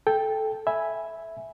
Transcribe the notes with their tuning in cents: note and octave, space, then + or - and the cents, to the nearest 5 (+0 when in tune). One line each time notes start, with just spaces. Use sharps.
A4 -10 G5 +10
E5 +0 G#5 +0 B5 +0